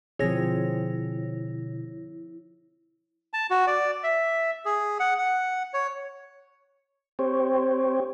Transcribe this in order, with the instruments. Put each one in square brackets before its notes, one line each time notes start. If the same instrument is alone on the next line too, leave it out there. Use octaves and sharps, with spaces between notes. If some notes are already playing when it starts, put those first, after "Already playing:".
[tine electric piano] B2 D3 [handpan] F3 C4 G#4 [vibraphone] E4 [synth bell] C#5 A#6
[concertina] A5
F#4
D5
E5
G#4
F#5
F#5
C#5
[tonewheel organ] C4 G4 C5 C#5